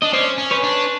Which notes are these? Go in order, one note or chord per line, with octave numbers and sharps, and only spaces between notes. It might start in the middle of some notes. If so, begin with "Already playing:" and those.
D4 D#5
C#4 C5 D5
C#4
B4 C#5
D4